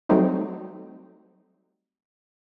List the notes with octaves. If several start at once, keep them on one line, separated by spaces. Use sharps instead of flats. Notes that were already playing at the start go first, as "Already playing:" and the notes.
F#3 G3 A3 C4 D#4